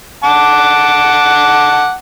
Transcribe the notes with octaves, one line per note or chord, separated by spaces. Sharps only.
F#5 A5 D6